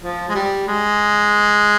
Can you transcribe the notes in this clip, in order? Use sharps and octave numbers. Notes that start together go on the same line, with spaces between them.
F3
G#3
G3
G#3